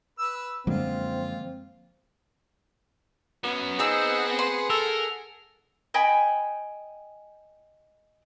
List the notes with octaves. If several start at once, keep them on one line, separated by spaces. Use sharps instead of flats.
B4 E6
F#2 D3 F3 G#3 A#3 C4 F4
F#3 B3 C#4
C4 D#4 G#4 F#5 E6
B4 C6
A4 A#4
D#5 G5 G#5 B5